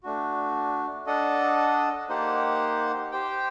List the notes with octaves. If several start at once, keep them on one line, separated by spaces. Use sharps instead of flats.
A3 D4 F#4
D4 A4 D#5 F#5
A#3 D#4 G4 C5 F#5
G4 C5 G5